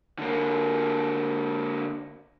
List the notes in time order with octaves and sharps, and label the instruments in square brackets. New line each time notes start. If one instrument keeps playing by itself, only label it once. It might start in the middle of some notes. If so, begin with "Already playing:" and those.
[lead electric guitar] D3 A#3